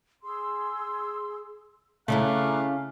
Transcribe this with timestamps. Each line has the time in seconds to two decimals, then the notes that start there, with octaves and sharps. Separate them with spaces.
0.23 G#4 C6 E6
2.08 C#3 A3 C#4 E4 F5 A#5 D6 F#6